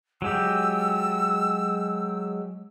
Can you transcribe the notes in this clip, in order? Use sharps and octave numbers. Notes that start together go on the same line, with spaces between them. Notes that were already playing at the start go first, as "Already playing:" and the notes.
F#3 G#3 G4 E6